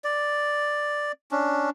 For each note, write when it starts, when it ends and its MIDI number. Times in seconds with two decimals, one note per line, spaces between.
0.04 1.12 74
1.31 1.70 61
1.31 1.70 62